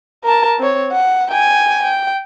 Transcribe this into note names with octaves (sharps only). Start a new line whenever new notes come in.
A#4 A5
C4 C#5
F#5
G5 G#5
G5